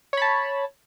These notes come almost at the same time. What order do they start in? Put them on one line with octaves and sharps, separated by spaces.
C#5 B5 A5